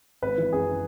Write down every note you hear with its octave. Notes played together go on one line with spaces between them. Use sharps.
G#1 B4
E3
F#2 G#4